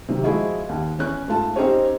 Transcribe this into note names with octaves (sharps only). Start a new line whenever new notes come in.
C3 D#3 F#3
F3 G#3 E4 F#4 G#4 D#5
D#2
E2 C#4 F#6
G#2 A3 F4 A5
C4 C#4 D#4 G4 C5 C#5